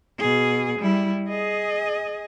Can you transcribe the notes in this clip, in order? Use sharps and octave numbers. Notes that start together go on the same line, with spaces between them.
B2 G#4
G3 E4
G#4 D#5